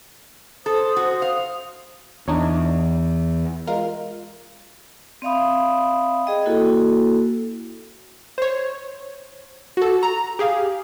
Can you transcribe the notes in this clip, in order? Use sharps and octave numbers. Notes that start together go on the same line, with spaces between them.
A4 C5 D#6
F#4
F5
E2 D4 D#4 C#5
G#3 F4 A#4
C4 D5 E5 F5 B5 D#6
G#4 D#5 G5
A#3 E4 F#4 A4
C5 C#5
F#4 A4
A#5
G4 G#4 F5